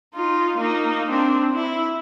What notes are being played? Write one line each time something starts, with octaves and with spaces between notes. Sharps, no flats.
D#4 F4
A#3 D#4
C4 D4
E4